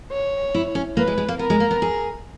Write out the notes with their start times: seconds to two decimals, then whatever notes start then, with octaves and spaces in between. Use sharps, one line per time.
0.12 C#5
0.54 E4
0.75 C#4
0.97 A#3 B4
1.07 G#3
1.18 G#3
1.28 A#3
1.39 B3 A#4
1.50 G#3
1.60 A#3
1.71 B3
1.82 G#4